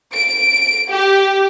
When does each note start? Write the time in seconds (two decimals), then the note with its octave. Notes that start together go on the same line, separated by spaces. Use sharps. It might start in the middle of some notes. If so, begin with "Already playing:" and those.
0.12 D7
0.91 G4